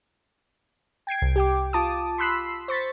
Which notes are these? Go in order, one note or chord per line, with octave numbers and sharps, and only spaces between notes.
G5 G#6 C7 D7
C2
G4 G5 D6
F4 A5 D6 D#6
B5 C6 E6 F#6 B6 C7
C5 C#6 A6 B6